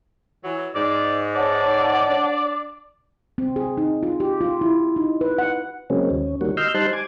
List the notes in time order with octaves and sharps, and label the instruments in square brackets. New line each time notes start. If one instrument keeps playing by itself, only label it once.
[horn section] E3 F#3
[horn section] G#2 [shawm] D5
[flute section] C#5 F#5 A5 [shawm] D5
[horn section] D4
[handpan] C4
G#4
D#4
F4
G4
F4
E4
D#4
B4
F#5
[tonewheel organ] C#3 F#3 G#3 A#3 C4 C#4
D#2 C#4
D#3 G3 A#3 F#4
D#5 C6 E6 F6 G6
G3 D#4 C5 A5 C6 F#6
G#5 D6 G#6